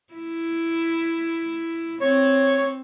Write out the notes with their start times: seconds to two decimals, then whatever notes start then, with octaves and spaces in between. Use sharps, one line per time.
0.13 E4
2.02 C4 C#5